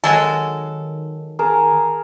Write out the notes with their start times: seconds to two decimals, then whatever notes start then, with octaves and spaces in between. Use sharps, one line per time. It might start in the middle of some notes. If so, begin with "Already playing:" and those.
0.04 D#3 F#3 G#3 A4
1.39 G#4 A#4 A5